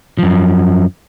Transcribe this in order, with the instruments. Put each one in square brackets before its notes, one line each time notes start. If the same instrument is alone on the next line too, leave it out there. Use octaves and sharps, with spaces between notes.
[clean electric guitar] F#2 F3